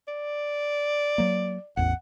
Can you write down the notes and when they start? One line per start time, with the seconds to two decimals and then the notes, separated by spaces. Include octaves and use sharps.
0.08 D5
1.18 F#3 A#3
1.77 A1 E2 F#5